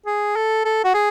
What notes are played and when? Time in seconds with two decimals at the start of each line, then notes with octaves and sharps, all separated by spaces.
0.06 G#4
0.36 A4
0.65 A4
0.85 F#4
0.94 G#4